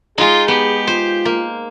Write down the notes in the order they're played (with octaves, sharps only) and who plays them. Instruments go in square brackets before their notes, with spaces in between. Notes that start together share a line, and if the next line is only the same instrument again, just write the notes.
[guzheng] G#3 D#4 [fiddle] F4 [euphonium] G#4
[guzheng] B3 [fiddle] G4
[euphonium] F4 [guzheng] C5
[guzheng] A#3